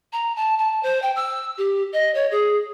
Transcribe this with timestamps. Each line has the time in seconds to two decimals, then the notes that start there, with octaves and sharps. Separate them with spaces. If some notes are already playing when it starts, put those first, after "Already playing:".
0.13 A#5
0.36 A5
0.59 A5
0.83 C5
1.02 G5
1.16 E6
1.58 G4
1.93 D#5
2.14 C#5
2.31 G#4